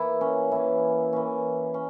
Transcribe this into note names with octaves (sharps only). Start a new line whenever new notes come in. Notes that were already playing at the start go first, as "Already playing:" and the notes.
Already playing: E3 A#3 E4
C#4
E3 A#3 C#4 E4
E3 A#3 C#4
C#4